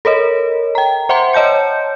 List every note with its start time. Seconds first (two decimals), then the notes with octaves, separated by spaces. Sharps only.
0.05 A4 A#4 C#5 D#5
0.75 G5 A#5
1.09 C5 E5 F#5 G5 A#5 C6
1.33 C#5 D#5 A5 G6 C#7